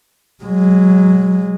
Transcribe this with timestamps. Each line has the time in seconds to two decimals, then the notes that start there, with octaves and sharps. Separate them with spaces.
0.44 F#3 G#3